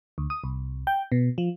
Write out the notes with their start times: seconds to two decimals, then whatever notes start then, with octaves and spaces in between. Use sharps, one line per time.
0.18 D2
0.30 D#6
0.44 C2
0.87 G5
1.12 B2
1.38 F3